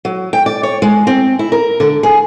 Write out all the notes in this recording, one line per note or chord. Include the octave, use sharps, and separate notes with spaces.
F#3
G5
D5
C#5
G#3
C4
E4
A#4
D3
G#4